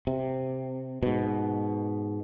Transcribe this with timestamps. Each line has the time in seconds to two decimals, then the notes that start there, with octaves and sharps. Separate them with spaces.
0.07 C3
1.03 G#2 B2